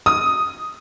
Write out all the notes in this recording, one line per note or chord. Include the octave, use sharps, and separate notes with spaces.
D#6